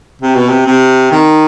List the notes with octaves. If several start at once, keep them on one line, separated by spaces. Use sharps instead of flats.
C3
B2
C3
C3
D#3